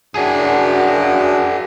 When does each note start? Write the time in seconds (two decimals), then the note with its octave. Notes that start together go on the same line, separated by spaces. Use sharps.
0.15 F#2 D4 F#4 G#4